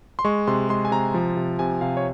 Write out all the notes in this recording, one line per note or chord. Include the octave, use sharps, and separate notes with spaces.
C6
G#3 C#6
C3 C6
G#3 C6
G#5
C3 A#5
F3
C3
C3 G#5
C3 F5
C#5